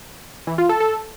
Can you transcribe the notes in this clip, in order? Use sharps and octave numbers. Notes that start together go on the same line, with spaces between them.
E3
F4
A4
A4